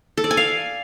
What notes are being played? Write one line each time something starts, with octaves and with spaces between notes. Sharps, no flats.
A4
D5
G#5
F5